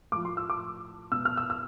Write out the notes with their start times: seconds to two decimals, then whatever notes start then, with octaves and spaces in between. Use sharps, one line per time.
0.12 A2 D6
0.16 F3
0.25 C6
0.37 E6
0.50 D6
1.12 B2 E6
1.25 F6
1.37 E6
1.50 E6